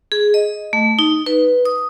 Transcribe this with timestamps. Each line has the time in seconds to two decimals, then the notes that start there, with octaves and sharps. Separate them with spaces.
0.12 G#4
0.34 D#5
0.73 A3
0.99 D#4
1.26 B4
1.65 D#6